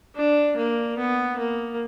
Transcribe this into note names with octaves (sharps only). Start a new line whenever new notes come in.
D4
A#3
B3
A#3